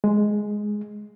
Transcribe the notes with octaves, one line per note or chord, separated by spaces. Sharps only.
G#3